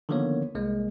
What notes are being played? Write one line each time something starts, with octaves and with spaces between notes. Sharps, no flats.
D3 D#3 F3 A#3 B3 C#5
C2 G#3 A#3